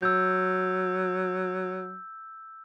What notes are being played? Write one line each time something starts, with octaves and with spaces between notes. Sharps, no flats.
F#3 E6 G6